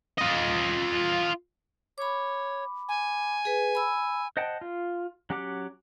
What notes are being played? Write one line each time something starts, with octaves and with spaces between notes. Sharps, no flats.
F4 D#5
C#5 B5 D6
G#5
G#4 B4
B5 E6
C5 D#5 F#5 G5 A5
F4
F#3 C#4 G4 F#5 D6